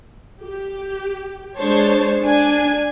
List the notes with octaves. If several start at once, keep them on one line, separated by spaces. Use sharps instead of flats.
G4
G#3 D4 C5 C#5 A5
D4 G#5